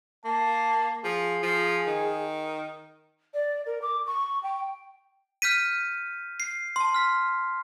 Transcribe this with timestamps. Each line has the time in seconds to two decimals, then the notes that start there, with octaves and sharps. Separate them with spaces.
0.25 A#3 A5
1.04 F3 G#4
1.43 F3
1.87 D#3
3.34 D5
3.66 A#4
3.82 D6
4.07 C#6
4.43 G5
5.42 F6 G6 B6 D#7
6.40 C7
6.76 A5 C6
6.94 F6 B6